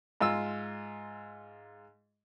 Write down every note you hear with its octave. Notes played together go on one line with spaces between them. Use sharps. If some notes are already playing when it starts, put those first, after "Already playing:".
G#2 F4 E6